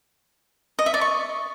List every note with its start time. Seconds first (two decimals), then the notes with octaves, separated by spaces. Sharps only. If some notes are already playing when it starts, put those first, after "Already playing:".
0.79 D#5
0.86 E5
0.94 D5
1.01 C#6